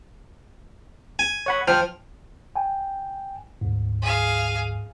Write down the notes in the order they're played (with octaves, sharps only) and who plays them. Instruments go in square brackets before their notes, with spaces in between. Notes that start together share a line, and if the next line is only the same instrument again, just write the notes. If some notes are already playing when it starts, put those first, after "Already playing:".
[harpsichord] G#5
[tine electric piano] C#5 F#5 B5
[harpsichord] F3 [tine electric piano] G5 F6
[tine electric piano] G5 G#5
D2 G#2
[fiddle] G#4 F5